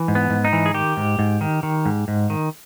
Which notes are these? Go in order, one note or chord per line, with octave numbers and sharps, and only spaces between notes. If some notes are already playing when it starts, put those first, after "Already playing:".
Already playing: E3
G#2
B3
G#2
D#4
E3
G#4
D#3 G4
G#2
G#2
D#3
D#3
G#2
G#2
D#3